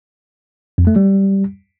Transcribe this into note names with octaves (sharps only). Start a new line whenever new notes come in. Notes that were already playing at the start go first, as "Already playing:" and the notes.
F2
A3
G3